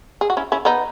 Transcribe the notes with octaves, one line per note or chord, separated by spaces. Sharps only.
G#4
F#4
C#4 E4
C#4 E4
B3 D#4